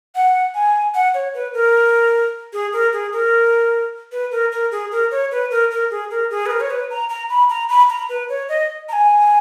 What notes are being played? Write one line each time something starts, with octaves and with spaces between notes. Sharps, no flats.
F#5
G#5
F#5
C#5
B4
A#4
G#4
A#4
G#4
A#4
B4
A#4
A#4
G#4
A#4
C#5
B4
A#4
A#4
G#4
A#4
G#4
B4
A#4
C#5
B4
A#5
A#5
B5
A#5
B5
A#5
B4
C#5
D#5
A#5
G#5